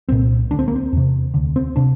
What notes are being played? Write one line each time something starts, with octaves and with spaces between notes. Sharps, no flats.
C2 A#2 C4
D2 D3 D4
C4
A#3
C4
E2 C3
D2 D3
C4
C3 D4